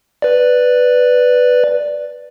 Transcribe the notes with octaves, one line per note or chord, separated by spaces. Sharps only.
B4 D5